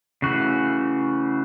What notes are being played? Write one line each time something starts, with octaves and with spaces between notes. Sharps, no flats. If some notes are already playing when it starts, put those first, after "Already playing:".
C#3 E3 A3 C#4 F#4